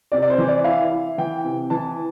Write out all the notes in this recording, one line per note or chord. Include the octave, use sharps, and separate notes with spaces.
C3 D5
D5
C5
E3
D5
E4 F5
E4
E3 G5
C3
E3 A5